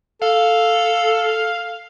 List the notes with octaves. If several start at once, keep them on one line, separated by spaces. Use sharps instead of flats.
A4 F5